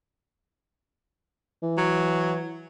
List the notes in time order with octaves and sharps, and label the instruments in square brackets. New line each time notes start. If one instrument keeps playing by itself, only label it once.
[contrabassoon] E3
[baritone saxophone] F#3